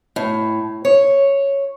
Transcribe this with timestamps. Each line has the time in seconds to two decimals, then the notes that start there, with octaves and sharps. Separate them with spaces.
0.16 A2
0.85 C#5